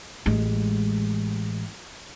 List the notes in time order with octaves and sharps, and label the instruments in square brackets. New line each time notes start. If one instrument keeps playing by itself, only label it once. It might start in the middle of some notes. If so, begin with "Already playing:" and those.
[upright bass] A1 G#3